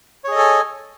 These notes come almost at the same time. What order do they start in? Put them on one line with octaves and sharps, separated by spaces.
C#5 G#4 D#5 A4 G#5